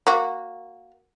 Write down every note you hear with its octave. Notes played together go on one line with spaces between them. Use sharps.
A#3 F#4